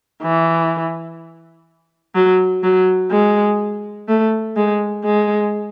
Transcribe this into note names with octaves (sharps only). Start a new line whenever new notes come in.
E3
F#3
F#3
G#3
A3
G#3
G#3